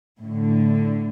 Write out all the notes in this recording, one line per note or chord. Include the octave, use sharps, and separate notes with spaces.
A2 D3